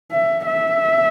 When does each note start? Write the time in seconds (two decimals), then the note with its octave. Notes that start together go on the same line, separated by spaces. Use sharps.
0.11 E5
0.46 E5